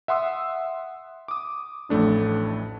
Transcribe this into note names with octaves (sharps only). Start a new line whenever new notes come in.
E5 F#5 C6 D#6 E6
D6 D#6
A1 F2 A3 D4 E4